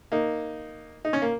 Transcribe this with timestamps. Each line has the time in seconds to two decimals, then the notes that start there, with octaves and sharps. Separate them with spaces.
0.12 A#3 D#4
1.05 D#4
1.13 C#4
1.22 A#3